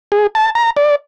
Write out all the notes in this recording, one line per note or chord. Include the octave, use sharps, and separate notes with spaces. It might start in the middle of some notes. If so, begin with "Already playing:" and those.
G#4
A5
A#5
D5